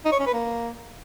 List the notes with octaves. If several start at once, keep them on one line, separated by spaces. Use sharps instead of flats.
D#4
C#5
C#4
B4
A#3